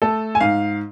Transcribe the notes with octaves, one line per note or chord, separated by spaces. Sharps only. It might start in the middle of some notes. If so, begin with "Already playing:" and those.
A3 A4
G#5
G#2 F5